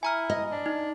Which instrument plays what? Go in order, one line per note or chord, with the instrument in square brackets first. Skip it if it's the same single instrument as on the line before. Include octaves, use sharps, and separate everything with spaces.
[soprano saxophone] E4 [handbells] G#5 A#5 F6
[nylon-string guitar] D#5
[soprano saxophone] D4
[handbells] D#4